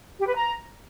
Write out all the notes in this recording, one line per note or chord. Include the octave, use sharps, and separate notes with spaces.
G4
B4
A#5